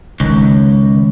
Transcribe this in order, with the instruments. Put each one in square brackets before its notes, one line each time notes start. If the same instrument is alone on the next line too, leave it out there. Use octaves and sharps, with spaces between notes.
[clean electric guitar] C#2 [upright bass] D#3